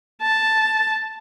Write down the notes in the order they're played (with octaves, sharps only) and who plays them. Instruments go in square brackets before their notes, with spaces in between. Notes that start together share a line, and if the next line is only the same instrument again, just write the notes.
[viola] A5